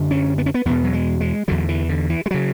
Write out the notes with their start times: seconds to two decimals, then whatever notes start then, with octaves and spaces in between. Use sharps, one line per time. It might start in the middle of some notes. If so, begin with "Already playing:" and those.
Already playing: F#2 D3
0.11 C#4
0.38 B3
0.46 C#4
0.54 B3
0.65 E2 B2 B3
0.84 F#3
0.93 G#3
1.21 G#3
1.48 E2 D3 F#3
1.69 E3
1.89 D3
2.10 E3
2.26 G#3
2.31 C#3 F#3